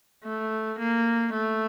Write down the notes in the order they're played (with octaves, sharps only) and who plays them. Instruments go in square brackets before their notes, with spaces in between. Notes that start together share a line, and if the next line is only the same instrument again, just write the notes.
[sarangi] A3
A#3
A3